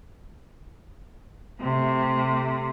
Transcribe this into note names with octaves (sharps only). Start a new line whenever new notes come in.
C3 A3